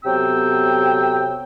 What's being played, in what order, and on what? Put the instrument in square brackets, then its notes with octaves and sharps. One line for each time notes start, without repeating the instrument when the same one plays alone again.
[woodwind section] C3 F#3 B3 A4 G5 E6